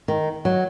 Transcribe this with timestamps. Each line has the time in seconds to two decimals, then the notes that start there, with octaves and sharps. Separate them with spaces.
0.08 D#3
0.45 F#3